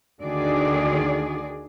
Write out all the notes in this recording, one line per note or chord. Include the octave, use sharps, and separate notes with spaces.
D2 D3 D#3 F#4 G#4 D5